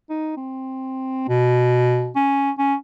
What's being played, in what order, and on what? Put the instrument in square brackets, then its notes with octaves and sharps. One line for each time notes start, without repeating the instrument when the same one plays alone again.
[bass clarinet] D#4
C4
B2
C#4
C#4